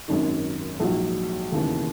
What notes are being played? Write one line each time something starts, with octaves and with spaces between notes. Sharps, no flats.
G#1 F#2 D#3
A#1 G#2 F#3
E1 D#2 C#3 E3